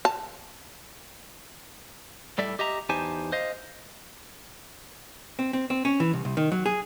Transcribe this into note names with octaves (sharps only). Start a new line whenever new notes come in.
A5
A2 G3 A4 D5 E5
G4 D#5 E5 A#5
E2 D#4 G4 C5 G#5 A5
C5 D#5 F5
C4
C4
C4
C#4
E3
C2
C2
D#3
F#3
G#4